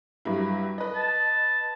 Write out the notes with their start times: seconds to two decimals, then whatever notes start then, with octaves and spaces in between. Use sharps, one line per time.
0.25 G2 F#3 E4
0.78 B4 D#5
0.95 A5